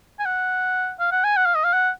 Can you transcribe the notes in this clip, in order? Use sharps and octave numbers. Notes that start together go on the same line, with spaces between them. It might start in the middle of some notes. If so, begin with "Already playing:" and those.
G#5
F#5
F5
F#5
G#5
F#5
F5
D#5
F5
F#5